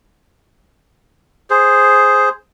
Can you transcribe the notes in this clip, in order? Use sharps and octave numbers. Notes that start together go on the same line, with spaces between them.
G#4 C5